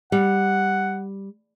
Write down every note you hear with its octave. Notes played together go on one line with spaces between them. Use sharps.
G3 F#5